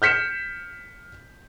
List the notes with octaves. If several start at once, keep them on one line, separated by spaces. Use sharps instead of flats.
F6 G6 B6 C#7 E7